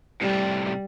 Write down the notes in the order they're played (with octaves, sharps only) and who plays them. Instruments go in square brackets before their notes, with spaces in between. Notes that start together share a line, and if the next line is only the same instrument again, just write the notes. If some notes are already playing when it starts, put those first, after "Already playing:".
[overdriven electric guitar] A2 C3 [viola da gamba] G3